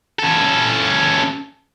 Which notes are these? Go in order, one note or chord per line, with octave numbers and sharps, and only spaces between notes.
C#4 A4